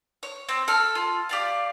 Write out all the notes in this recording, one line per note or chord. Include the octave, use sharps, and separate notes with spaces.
C#5
C4
A4 F6
F4
G4 D5 F5